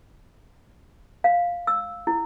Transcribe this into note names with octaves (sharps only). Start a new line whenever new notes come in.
F5
E6
E4